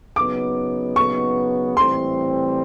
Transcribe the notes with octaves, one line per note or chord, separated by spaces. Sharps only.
C#3 F#3 B3 D#4 D6
C#6
A2 E3 G3 C4 C6